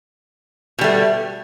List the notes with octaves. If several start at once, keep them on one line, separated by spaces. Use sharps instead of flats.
B2 G3 A3